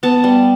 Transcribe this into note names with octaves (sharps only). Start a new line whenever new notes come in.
B3 A5
G3